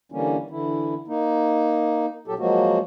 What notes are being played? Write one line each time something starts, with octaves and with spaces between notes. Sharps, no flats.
D3 E3 G3 A#3 C#4
D3 E3 E4
A#3 D#4
A#2 F#3 G4 A4
F3 F#3 G#3 A#3 F#4